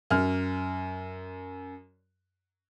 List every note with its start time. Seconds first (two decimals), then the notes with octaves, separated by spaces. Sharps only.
0.10 F#2 F6